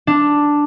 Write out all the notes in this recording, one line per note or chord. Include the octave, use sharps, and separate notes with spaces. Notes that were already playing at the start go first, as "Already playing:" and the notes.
D4